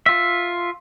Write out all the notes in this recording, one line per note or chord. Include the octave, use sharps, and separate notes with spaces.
F4 E5